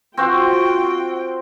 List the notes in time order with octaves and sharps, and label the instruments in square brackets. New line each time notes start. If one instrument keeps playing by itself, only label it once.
[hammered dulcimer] C4 F#4 C5 [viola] F4 G5